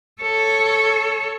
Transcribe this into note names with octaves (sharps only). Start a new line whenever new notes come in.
A4 C#5